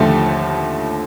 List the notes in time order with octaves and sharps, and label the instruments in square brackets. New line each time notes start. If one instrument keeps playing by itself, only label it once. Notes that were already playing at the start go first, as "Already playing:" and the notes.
Already playing: [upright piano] D#2 D3 F3 A3 G4